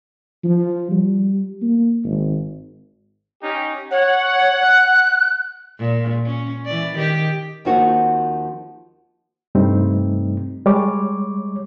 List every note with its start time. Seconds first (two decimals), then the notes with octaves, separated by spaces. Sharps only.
0.44 F3
0.91 G3
1.62 A#3
2.04 G#1
3.42 C#4 D#4 G4
3.91 C#5 F#5
4.61 F#6
5.78 A#2
6.26 C#4
6.66 E3 D5
6.96 D#3 G4
7.65 D#2 F3 A#3 C4 D#4 F#4
9.55 G2 C3 G3 A3 C4 D#4
10.66 G3 G#3 C#5 D6